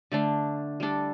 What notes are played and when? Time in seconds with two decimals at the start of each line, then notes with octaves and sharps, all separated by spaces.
0.12 D3 A3 D4
0.80 G3 D4 A4